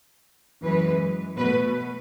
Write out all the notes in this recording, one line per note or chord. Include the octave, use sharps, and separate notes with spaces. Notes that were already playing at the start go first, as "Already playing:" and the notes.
F#2 E3 G#3 B4
B2 A3 B4